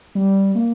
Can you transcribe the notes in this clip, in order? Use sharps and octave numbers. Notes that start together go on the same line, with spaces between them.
G3
A#3